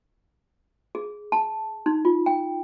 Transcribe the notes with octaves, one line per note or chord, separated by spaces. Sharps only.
G#4
A5
D#4
F4
G5